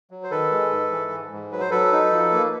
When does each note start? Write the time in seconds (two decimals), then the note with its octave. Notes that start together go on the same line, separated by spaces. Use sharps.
0.11 F#3
0.24 C5
0.31 D#3 A4 B4
0.51 G#3
0.71 G#2
0.91 E3
1.12 G#2
1.32 G#2
1.52 F#3 B4
1.61 C5
1.70 F#3 A4 B4
1.92 D#4
2.12 F3
2.32 A#3